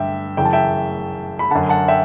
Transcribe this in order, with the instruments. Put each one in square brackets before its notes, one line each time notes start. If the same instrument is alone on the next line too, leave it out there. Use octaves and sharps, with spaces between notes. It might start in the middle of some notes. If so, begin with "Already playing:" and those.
Already playing: [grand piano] G2 D3 E5 G5
F#2 C#3 E3 G5
A5
E5 G5
B5
D3 F#5 A5
F#2
F#5 A5
E5 G5